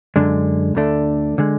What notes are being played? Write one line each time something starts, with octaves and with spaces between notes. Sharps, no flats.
F#2 D3 G#3 D4
D2 D3 A3 D4
D3 G#3